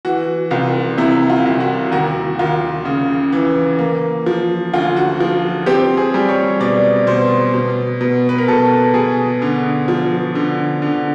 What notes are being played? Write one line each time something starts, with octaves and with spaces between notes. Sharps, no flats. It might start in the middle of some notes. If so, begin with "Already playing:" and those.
E3 F#4
C2 F4
C3 E4
F4
C2
F#4
D#2 F#4
D#2 F4
C#3
E3
A#3
F3
D2 F4
F#4
F3
C4 G4
G#4
G3
C#5
B2 D5
B2 C5
B2
B2
B4
A#4
B2 A4
B2 G#4
D3
F3
D3
D3